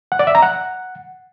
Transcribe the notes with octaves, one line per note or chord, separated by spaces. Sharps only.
F#5
D5
E5
A#5
F#5